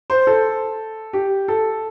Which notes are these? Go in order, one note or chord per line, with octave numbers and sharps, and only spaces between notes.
C5
A4
G4
A4